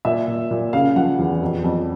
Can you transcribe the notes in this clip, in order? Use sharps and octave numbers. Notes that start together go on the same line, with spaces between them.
A#2 E5
A#2
A#2
C#3 F5
F3 F#5
E2
F2
F2